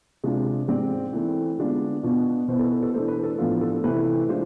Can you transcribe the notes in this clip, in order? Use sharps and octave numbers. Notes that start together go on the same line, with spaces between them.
C3 G#3 D4 F4
G#2 G#3 C4 D5
E3 A3 C4
D3 G#3 B3 D4 F4
B2 B3 D4 F4
B2 B3 E4 C5
A4
B4
A4
E3 A3 D4 C5
B4
B4
A4
A2 F3 B3 D4 F4
A4
C3 E3 A3 C4 E4 B4
E3 G#3 D4 F4 C5